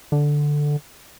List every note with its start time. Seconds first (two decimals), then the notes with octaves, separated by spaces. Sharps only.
0.12 D3